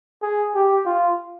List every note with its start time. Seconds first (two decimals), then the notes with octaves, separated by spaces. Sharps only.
0.22 G#4
0.55 G4
0.86 F4